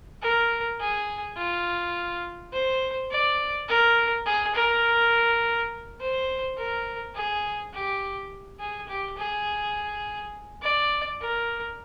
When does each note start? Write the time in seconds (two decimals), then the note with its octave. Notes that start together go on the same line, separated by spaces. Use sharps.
0.22 A#4
0.80 G#4
1.37 F4
2.52 C5
3.11 D5
3.68 A#4
4.26 G#4
4.55 A#4
6.00 C5
6.57 A#4
7.15 G#4
7.73 G4
8.60 G#4
8.88 G4
9.17 G#4
10.62 D5
11.21 A#4